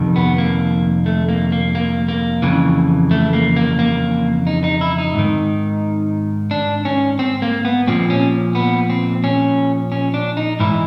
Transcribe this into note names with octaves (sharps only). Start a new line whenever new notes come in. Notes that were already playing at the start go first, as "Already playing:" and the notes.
Already playing: F2 C3 D#3
B3
A#3
A3
A#3
A#3
A#3
A#3
F2 C#3 E3
A3
A#3
A#3
A#3
D#4
D#4
E4
D#4
G#2 D#3
D4
C#4
C4
A#3
B3
A#2 F3 C4
C#4
B3
C4
C#4
C#4
D4
D#4
G#2 E3 E4